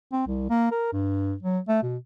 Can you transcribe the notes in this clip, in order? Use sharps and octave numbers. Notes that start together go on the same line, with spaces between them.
C4
C2
A#3
A#4
G2
F#3
A3
B2